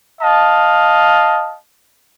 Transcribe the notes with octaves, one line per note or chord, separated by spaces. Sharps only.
D#5 F5 A5